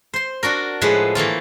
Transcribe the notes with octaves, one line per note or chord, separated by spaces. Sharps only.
C5 C6
D4 F#4 A#4
A2 F3 G#3 B4 F#5
E3 A3 A#3 F4